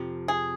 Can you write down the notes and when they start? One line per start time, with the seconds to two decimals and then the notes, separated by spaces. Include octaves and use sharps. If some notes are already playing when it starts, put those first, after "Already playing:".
Already playing: F2 C3 F3
0.28 G#4